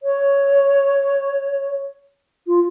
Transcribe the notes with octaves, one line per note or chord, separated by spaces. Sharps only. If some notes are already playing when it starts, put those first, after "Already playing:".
C#5
F4